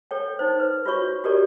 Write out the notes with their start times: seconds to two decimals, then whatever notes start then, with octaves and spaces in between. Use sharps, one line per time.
0.11 A4 C#5 G5
0.39 D#4 C5
0.60 B4
0.86 F4 F#4 C#5 C#6
1.24 F#4 G4 A4 A#4 C#5 D5